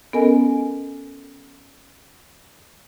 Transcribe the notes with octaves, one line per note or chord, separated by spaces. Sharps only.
B3 C#4 A4 A#4 D#5 G#5